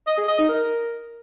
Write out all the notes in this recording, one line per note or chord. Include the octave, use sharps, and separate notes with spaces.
D#5
G#4
D#5
D#4
A#4